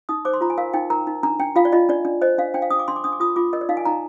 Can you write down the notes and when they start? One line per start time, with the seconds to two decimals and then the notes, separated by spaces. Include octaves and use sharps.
0.09 D#4 D#6
0.25 C5 D6
0.33 C6
0.41 F4 A#5
0.50 G#5
0.58 A#4 F5
0.74 D#4 G5
0.90 A#4 A#5
1.07 D#4
1.23 D4 A#5
1.39 D4 G5
1.56 F4 F5
1.65 D5
1.72 F4 D#5
1.89 D4 D5
2.05 D4
2.22 C5 D#5
2.38 D4 F5
2.54 D4 G5
2.62 F5
2.70 D4 D#6
2.79 D6
2.88 D4 C6
2.96 D6
3.04 D4 D#6
3.12 D6
3.20 F4 D#6
3.36 F4 D6
3.53 A#4 D#5
3.61 D5
3.69 D#4 F5
3.77 G#5
3.85 D#4 A#5